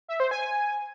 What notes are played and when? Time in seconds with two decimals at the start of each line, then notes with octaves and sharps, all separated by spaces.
0.08 E5
0.20 C5
0.31 G#5